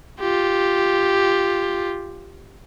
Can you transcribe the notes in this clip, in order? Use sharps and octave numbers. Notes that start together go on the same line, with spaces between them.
F4 G4